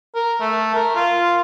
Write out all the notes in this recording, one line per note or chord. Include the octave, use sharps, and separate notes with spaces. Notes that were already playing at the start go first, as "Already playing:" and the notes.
A#4
A3
A#4
F4